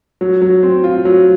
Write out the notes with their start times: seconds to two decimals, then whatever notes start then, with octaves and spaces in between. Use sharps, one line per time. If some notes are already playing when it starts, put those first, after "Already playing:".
0.21 F#3
0.42 F#3
0.63 C4
0.84 F4
1.05 F#3